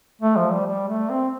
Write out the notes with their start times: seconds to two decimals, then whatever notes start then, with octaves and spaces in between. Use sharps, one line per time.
0.22 A3
0.37 F3
0.51 G3
0.66 G3
0.88 A3
1.10 C4